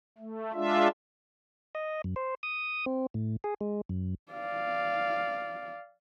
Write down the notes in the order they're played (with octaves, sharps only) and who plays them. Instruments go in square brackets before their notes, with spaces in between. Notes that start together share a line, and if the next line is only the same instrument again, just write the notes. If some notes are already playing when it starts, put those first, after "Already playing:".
[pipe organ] A3
G#3 D4 F4 E5
[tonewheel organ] D#5
F#2
C5
D#6
C4
A2
G#4
G#3
F#2
[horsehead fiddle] D5 F5